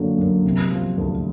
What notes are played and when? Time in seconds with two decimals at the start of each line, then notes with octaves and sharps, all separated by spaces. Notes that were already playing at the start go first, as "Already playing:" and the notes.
Already playing: F#2 D3 F#3 A#3
0.18 F#2
0.44 C3
0.70 F3
0.98 D2